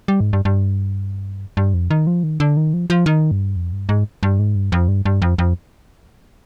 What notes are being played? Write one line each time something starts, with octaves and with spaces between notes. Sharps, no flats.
G3
G#2
G2
G2
G2
F2
D#3
F3
D#3
D3
D#3
F3
F3
D#3
G2
F2
G2
G#2
G2
G#2
G2
F2
G2
G2
F2
F2